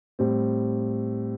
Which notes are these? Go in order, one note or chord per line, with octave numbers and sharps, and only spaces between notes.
A2 G3 C4